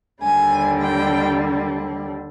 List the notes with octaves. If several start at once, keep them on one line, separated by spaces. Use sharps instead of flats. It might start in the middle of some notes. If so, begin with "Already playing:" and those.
D#2 D3 G3 G#5
G5